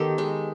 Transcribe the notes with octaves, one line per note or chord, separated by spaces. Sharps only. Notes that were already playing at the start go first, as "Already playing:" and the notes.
Already playing: D#3 B3 G4 A4
G#3